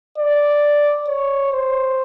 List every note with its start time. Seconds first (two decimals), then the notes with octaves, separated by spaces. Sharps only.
0.18 D5
1.08 C#5
1.53 C5